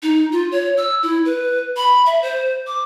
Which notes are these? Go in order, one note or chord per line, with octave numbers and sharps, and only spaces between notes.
D#4
F4
C#5
E6
E4
B4
B5
E5
C5
D6